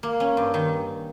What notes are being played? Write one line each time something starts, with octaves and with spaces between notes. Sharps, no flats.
A#3
C#4
G2
D#3